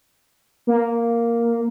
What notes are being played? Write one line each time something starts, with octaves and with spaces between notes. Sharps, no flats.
A#3